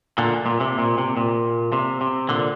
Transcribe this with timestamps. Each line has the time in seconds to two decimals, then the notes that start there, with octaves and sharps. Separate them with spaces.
0.18 A#2 D3
0.46 A#2
0.60 C3
0.79 A#2
0.98 C3
1.17 A#2
1.73 C3
2.01 C3
2.29 A#2 D3